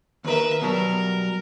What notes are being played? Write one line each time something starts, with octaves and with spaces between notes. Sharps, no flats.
D#2 A#4 B4 E5
B2 F#3 G3 A#4